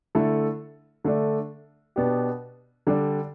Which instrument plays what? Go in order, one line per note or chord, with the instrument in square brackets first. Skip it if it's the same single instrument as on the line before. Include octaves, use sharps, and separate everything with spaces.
[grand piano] D3 A3 E4 A4
D3 A3 D4
B2 B3 D4 G4
D3 G3 D4